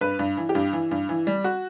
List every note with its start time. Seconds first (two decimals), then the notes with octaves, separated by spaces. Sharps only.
0.01 G2 B4
0.19 G2
0.37 E3
0.49 G4
0.55 G2
0.73 E3
0.91 G2
1.09 E3
1.27 G3
1.44 F#4